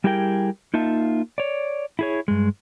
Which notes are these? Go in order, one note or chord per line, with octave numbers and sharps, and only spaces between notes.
G3 E4 G4 G#4 A#4 G5
A#3 D#4 F4 E5 A5
C#5 D5
E4 G#4 C#5
G2 G#3